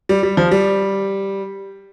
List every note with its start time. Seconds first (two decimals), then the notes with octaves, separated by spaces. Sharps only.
0.09 G3
0.23 G3
0.37 F3
0.51 G3